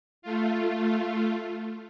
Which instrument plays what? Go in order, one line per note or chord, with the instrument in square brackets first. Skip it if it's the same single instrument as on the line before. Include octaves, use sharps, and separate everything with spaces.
[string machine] A3 F4